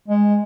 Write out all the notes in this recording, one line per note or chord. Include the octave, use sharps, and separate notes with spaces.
G#3